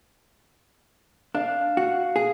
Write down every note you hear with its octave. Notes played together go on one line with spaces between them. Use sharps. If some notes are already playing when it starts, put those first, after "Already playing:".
D4 F5
F#4
G#4